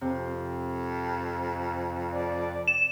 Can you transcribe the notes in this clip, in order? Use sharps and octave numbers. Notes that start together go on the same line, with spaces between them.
F2 C3
D5
E7